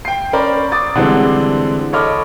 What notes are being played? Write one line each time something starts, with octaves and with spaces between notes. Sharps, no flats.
G5 C7
C#4 A#4 C5 D5 B5
D6 D#6 A6
D3 E3 G3 G#3 C4 D4
A4 C#5 D#5 B5 D6 F6